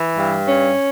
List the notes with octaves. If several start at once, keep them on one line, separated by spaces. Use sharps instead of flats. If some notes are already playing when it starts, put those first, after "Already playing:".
Already playing: E3
G2
C#4